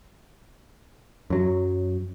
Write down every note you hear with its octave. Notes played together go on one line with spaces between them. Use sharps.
F#2 F#3